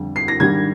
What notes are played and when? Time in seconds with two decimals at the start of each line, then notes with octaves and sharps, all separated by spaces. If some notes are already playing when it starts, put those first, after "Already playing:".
Already playing: F2 D3 G3
0.16 C7
0.28 A#6
0.40 G#2 D#3 G3 D4 G#6